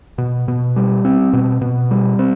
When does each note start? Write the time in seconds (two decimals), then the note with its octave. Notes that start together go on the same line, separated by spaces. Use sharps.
0.18 B2
0.48 B2
0.76 G3
1.05 C4
1.33 B2
1.61 B2
1.91 G3
2.19 C4